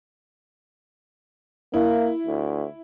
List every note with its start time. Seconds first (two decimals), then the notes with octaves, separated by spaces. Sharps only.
1.74 A#3 E4
2.27 D2